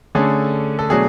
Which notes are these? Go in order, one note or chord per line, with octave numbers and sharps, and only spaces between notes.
D3 A3 C#4 G#4
A4
B2 F#3 A3 D4 G#4